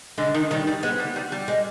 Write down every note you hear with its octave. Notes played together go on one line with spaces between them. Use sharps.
D3 G#3
D#3
D#3 G3
G3
G#3 B3
G3
G3
G3
G#3